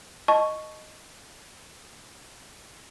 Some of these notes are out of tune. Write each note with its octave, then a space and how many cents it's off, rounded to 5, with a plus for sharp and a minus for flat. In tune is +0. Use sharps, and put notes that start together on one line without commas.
D#5 +0 A5 -20 C#6 +0